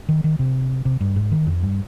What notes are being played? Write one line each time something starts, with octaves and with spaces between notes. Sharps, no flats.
D#3
D#3
C3
C3
G2
G#2
D#3
F2
G2